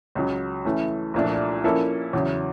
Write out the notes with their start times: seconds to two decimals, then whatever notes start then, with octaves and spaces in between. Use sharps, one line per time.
0.15 C#2 C#3 F#3
0.65 E3 A3 C#4
1.14 C2 A#2 F3 A3 D4
1.64 F3 A#3 C#4 E4 A4
2.13 E2 C#3 F#3